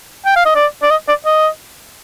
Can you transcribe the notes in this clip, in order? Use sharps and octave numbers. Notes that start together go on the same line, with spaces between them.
G5
F5
D#5
D5
D5
D#5
D5
D#5